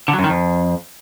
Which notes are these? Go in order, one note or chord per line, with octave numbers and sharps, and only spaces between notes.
D3
F#3
F#2
D#3
F2